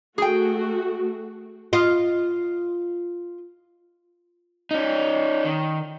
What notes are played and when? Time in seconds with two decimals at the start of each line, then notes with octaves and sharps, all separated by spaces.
0.18 A3 F#4 G#4 G5
1.73 F4 D#5
4.71 C#4 D#4
5.44 D#3